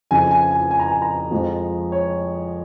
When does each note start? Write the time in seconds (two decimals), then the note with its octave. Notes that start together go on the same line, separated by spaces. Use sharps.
0.11 F2 C#3 F3 G#5
0.31 G#5
0.51 G#5
0.71 G#5
0.80 A#5
0.88 G#5
1.02 A#5
1.31 F2 F3 G#3
1.92 C#5